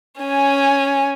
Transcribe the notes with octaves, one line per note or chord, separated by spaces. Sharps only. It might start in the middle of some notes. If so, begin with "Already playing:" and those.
C#4 G#5